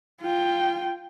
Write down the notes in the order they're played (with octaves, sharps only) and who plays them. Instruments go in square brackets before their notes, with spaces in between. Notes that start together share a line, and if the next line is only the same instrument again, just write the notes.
[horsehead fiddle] F4 G5